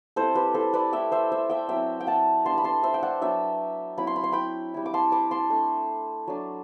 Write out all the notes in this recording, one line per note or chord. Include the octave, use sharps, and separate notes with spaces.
G3 C4 E4 A4 C5
G4 B4
A4 C5
B4 D5
A3 E4 E5 G5
C5 E5
C5 E5
E5 G5
F#3 C4 E4 E5 G5
G5
F#5 A5
G3 B3 D4 A5 C6
B5
A5 C6
C5 E5
G5
D5 F#5
F#3 B3 D4 E5 G5
F#3 C4 E4 B5
C6
B5
C6
G5 B5
G3 C4 E4
D6
A5 C6
B5 D6
A5 C6
A3 D4
F#3 A3 D4